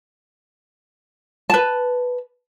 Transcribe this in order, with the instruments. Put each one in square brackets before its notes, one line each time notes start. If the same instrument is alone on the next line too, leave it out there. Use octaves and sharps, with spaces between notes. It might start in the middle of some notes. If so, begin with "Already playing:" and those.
[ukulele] B4 A5